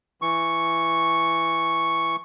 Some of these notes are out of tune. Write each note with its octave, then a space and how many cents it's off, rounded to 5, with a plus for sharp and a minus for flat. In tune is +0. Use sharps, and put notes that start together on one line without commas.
E3 +15 C#6 +0